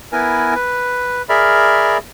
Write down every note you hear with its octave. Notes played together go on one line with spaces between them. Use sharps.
B3 E4 A#4 B4 G#5
B4
G#4 A#4 D5 E5 B5 F6